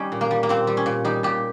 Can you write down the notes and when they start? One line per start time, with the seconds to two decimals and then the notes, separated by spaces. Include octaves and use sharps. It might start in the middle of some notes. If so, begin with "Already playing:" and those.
Already playing: G3 C#4 D#4
0.12 A#2
0.21 A#3
0.31 G3
0.43 A#3
0.49 A#2 C4
0.67 G3
0.77 C#4
0.86 A#2
1.05 G3 D#4
1.23 A#2 G4